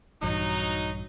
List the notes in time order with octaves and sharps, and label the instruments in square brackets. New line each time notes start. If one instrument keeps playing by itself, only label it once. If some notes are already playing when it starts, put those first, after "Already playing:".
[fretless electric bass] A#1 G2 E3 [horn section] F#3 D#4